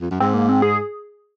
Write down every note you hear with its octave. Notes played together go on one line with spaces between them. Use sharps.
F2
F#2
G#2 C4
A#3
C4
G#4